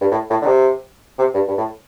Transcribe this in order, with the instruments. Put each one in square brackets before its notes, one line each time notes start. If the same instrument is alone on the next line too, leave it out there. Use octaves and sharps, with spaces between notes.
[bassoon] G2
A2
A2
D3
C3
C3
G2
G2
A2